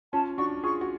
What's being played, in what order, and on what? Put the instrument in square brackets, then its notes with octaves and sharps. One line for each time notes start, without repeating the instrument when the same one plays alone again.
[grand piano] C#4 F4 [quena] A5
[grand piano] D4 F#4 [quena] C#6
[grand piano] F4 G#4 [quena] C#6
[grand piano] F#4